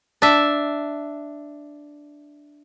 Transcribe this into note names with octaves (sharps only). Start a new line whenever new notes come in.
D4 E5